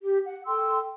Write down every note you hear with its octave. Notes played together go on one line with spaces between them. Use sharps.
G4
F#5
A4 G5 C6 E6